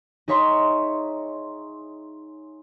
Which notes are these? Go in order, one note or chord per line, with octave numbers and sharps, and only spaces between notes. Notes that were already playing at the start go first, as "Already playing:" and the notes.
D#4 G#4 C#5 E5 A#5 C6